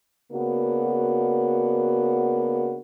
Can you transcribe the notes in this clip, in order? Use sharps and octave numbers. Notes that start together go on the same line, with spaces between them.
C#3 A#3 B3 D4 F#4